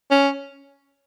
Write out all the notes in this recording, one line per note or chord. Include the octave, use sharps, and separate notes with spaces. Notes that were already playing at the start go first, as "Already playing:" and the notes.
C#4